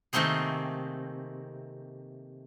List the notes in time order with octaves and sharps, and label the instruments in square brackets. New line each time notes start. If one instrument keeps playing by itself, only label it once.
[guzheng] C3 D#3 A3 A#3 C4 G#4